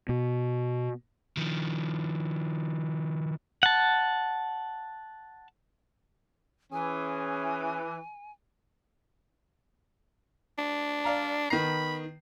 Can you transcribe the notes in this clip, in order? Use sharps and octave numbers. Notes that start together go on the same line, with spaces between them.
B2
D#3 F3
F#5 A5
E3 C#4 G#4 G#5
D4
D5 F5 A#5
D#3 B3 B5 C7